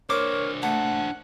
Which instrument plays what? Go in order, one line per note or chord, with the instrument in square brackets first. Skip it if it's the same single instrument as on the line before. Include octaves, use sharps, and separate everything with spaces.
[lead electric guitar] D4 C5 [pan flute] A#4 [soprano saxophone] C#5 [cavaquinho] D6
[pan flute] A3 [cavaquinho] A4 [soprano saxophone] F#5